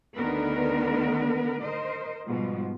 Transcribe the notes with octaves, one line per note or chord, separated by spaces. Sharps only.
D2 D3 D#3 B3 A#4 B4
A#4 C5 D#5
G#2 B2 F3 G3